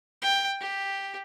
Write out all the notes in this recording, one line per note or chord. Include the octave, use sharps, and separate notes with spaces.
G5
G4